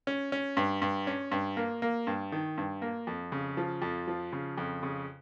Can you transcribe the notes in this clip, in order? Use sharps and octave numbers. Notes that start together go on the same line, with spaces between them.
C#4
C#4
G2
G2
C#4
G2
A#3
A#3
G2
D#3
G2
A#3
F2
C#3
F3
F2
F3
C#3
F2
C#3